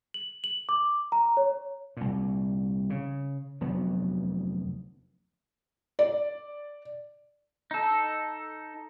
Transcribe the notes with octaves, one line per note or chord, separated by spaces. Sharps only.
F#7
F#7
D6
A#5
C#5
C2 A#2
C#3
F1 D2 F#3 B3
D5
D#4 A4